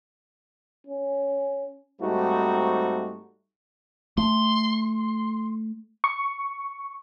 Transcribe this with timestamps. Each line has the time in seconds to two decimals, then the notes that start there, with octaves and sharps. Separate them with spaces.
0.87 C#4
2.02 G#2 G3 A3 C4 D#4 F#4
4.17 A3 C6
6.04 C#6